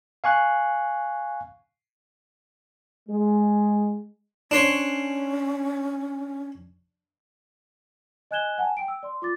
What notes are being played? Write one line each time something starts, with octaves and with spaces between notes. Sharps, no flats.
F5 G#5 C#6 F#6
G#3
C#4 D4 C5 C#5
D#5 G#5 F#6 G#6 E7 G7
F#5 G#5 A5
G5 D7
E6
D5 C6
F4 D6 A6